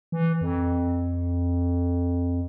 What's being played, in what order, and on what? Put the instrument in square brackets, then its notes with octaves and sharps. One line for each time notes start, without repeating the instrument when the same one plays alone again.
[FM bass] E3
F2